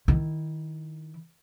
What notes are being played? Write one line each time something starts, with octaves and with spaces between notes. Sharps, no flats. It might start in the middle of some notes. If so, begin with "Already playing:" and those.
D#3 E4